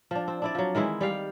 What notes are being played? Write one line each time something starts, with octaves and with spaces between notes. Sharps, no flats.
F3 D4
C4
D4 E4 D5
F3 F#3
D#3 E3 G#3 E4
G3 G4 F5